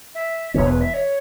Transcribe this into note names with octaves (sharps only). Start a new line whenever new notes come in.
E5
E1 E2 E3 B3 C#5
B4
E5
C#5